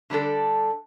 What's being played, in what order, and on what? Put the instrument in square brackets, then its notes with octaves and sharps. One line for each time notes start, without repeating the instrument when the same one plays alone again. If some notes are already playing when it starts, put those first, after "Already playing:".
[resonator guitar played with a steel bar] D3 G3 D4 A4